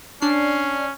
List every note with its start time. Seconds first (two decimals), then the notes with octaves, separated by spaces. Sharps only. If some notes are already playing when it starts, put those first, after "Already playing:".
0.22 C#4 D4 C7